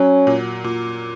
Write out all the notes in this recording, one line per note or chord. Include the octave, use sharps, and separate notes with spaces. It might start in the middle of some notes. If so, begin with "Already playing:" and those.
Already playing: F#3 C#4
A#2
A#2